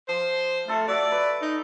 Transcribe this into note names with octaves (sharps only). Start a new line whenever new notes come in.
F3 C5
A3 F4 A4 F5
F#4 D5 E5
B4
D#4